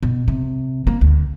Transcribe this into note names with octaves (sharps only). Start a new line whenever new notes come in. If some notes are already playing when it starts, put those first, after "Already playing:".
B2
C3
A#3
D2